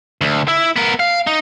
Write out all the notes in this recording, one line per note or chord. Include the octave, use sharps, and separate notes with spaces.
D2
E4
B3 A#4
F5
D#4